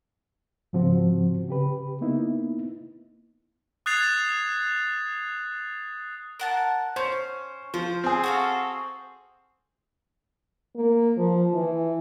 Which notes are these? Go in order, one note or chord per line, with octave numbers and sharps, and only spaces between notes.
G#2 C#3 F3 C4 F#4 C5
C#3 G4 B4
A#3 B3 D#4 E4
D#6 F#6 G#6 A6 C7 F7
A#4 F#5 A5
C#4 C5
F3 C5
C4 G#4
F#4 A4 F5
A#3
F3
E3